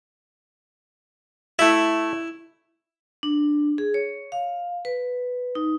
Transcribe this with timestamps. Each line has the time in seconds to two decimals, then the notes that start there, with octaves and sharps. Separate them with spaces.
1.59 A3 E4 E5
3.23 D4
3.78 G#4
3.94 C#5
4.32 F5
4.85 B4
5.55 D#4